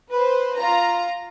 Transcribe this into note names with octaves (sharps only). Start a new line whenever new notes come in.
B4 C5
F4 A#5